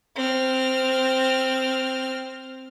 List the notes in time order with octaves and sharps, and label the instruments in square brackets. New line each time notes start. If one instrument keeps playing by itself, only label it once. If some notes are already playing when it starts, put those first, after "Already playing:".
[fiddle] C4 F6